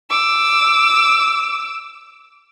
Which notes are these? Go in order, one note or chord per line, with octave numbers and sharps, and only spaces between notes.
D6 E6